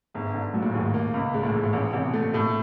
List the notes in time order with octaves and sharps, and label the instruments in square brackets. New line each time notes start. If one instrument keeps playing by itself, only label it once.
[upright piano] G1 [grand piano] G#2
[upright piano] D3
[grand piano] A#2 [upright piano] F#3
[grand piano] A2
[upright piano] D#2 [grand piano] G#2
[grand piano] A2
[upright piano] A#3
C#2
[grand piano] A#2 [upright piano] G#3
[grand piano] A2
[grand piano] G#2 [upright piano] E3
[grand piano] A2
[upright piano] A1
[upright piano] A1 [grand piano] C3
[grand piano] B2
[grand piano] A#2 [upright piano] A3
[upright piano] A2